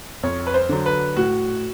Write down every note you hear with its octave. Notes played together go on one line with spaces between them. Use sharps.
F2 C#5
B4
C5
D3 F#3
B4
A2 F#4